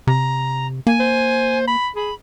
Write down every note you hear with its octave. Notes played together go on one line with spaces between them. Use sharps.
C3 A#5
A#3 G#5
C5
B5
G#4 B5